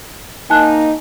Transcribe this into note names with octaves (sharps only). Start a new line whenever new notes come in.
A#3 D#4 G#5 A5 F#6